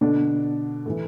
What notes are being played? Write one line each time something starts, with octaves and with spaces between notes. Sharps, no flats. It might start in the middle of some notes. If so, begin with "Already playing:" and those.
B2 D3 D4
A2 E3